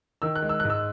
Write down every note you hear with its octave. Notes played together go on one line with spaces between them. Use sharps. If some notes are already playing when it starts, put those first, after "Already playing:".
D#3 E6
F#6
G#3
E6
G#2 F#6
E6